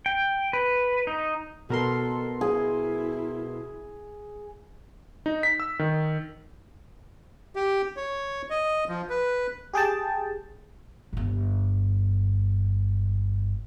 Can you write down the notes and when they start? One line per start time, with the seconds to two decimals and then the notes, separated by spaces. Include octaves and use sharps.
0.06 G5
0.53 B4
1.07 D#4
1.70 B2 A4 A#4 C6
2.41 E4 G#4
5.26 D#4
5.43 B6
5.60 E6
5.79 D#3
7.56 G4
7.97 C#5
8.50 D#5
8.88 F3
9.10 B4
9.73 G4 G#4 G5 A5
11.13 G1 G2